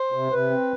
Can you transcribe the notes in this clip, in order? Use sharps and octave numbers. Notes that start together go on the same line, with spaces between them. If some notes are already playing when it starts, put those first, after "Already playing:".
Already playing: C5
C3
C3 B4
C4